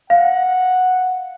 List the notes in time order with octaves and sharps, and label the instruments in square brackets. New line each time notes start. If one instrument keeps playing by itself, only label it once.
[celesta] F5 [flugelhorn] F#5